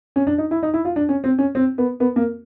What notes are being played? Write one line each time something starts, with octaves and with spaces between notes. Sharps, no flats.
C#4
D4
D#4
E4
D#4
E4
F4
D4
C#4
C4
C#4
C4
B3
B3
A#3